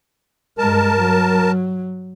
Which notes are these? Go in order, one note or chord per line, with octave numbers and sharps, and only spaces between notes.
G2 G#3 A#4 A5
F#3